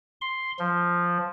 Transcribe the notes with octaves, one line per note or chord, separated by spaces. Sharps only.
C6
F3